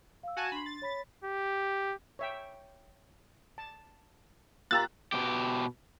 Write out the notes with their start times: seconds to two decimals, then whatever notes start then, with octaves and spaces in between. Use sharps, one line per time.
0.23 F5 E6
0.37 F#4 G#5 A5
0.52 D4 B5 C6 C7
0.66 A6
0.82 C#5 B5 B6
1.24 G4
2.19 C#5 E5 G5
3.58 A5
4.71 A#3 F4 G4 A#5 E6 F#6 A6
5.12 B2 G4